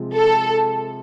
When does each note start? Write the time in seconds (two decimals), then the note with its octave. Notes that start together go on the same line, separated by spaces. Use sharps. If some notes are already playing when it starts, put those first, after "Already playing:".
Already playing: C3 F3 G#3
0.14 A4